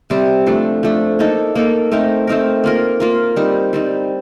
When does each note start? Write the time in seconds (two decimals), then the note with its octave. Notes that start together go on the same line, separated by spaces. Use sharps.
0.10 C3 G3 C4
0.46 F3 A3 D4
0.83 F3 A3 D4
1.19 A#3 D#4 A4
1.55 A#3 D#4 A4
1.92 A3 C4 D#4 A#4
2.27 A3 C4 D#4 A#4
2.64 A#3 F4 A#4
3.00 A#3 F4 A#4
3.36 G3 C4 D#4
3.73 G3 C4 D#4